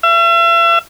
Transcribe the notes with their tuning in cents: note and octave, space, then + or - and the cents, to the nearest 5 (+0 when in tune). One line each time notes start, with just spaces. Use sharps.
E5 +40